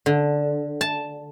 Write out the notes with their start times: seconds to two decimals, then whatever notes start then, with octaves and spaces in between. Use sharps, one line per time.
0.06 D3
0.81 A5